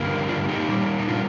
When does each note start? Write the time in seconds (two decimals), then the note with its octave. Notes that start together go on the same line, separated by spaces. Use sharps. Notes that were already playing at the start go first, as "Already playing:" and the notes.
Already playing: G2 D3 G3 A#3
0.28 D4 F4
0.49 D#4 G4
0.68 A#2 G3 A#3
0.99 D#4
1.08 D4 F4